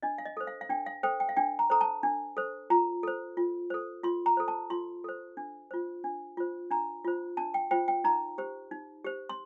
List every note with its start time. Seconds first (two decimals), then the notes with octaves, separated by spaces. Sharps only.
0.03 D4 D#5
0.18 F5
0.25 D#5
0.37 A4 C5
0.47 F5
0.61 F5
0.69 D4 G5
0.86 F5
1.03 A4 C5 G5
1.20 G5
1.29 F5
1.37 D4 G5
1.59 A#5
1.70 A4 C5 A#5
1.81 A5
2.03 D4
2.37 A4 C5
2.70 F4 A#5
3.03 A4 C5
3.37 F4
3.70 A4 C5
4.03 F4 C6
4.26 A#5
4.37 A4 C5
4.48 A5
4.70 F4 C6
5.04 A4 C5
5.37 D4
5.71 F4 C5
6.04 D4
6.37 F4 C5
6.71 D4 A#5
7.05 F4 C5
7.37 D4 A5
7.54 G5
7.71 F4 C5 G5
7.88 G5
8.04 D#4 A#5
8.38 G4 C5
8.71 D#4
9.04 G4 C5
9.29 C6